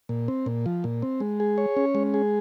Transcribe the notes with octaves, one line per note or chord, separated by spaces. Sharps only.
A#2
C4
A#2
F3
A#2
C4
G#3
G#4
C#5
C#4
G#3
G#4